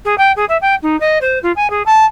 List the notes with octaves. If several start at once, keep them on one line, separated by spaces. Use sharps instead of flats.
G#4
G5
G#4
E5
G5
D#4
D#5
C5
F4
G#5
G#4
A5